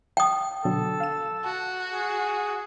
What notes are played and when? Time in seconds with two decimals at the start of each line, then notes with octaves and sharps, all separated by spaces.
0.17 F5 G5 D#6
0.65 B2 D3 F#3 A4
1.00 F5 E7
1.44 F#4 A5
1.94 G#4